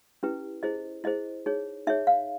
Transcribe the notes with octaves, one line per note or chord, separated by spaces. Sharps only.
C#4 E4 G4 B4
E4 G#4 C5 D#5
E4 G#4 C5 D#5
D#4 G#4 C#5
D#4 G#4 C#5 E5
F5